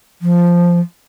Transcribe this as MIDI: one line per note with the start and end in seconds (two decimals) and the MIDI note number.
0.22 0.80 53